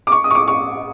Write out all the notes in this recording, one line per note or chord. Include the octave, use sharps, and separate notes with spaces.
D6
C#6
D#6
C#6
D6
C#6